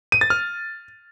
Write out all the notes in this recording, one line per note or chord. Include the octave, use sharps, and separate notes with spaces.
D#7
A6
F6